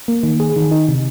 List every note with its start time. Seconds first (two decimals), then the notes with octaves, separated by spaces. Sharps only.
0.08 A#3
0.23 D#3
0.40 G#4
0.56 D#3
0.71 D#4
0.88 C3